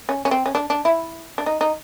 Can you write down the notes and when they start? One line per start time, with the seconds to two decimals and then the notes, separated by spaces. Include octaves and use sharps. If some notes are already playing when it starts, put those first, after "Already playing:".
0.09 C#4
0.25 C#4
0.31 C4
0.46 C#4
0.55 D4
0.70 D4
0.85 E4
1.38 D4
1.46 D#4
1.61 D#4